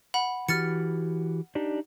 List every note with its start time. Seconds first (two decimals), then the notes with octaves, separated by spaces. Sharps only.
0.14 F#5 B5
0.49 E3 F#4 G4 F6 A6 C#7
1.55 D4 D#4 G4